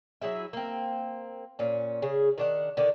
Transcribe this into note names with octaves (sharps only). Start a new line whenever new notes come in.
F#3 E4 G#4 E5
A#3 C4
A#2 C#4
C#3 G#4
D#3 D4 F#5
D3 D#3 D4